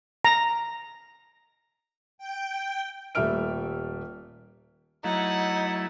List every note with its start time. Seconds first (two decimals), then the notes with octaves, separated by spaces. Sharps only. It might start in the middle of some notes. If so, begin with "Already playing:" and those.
0.25 A#5
2.18 G5
3.15 D#1 G3 A3 E5 F6 D7
5.04 F#3 A3 D#4 E4 F#5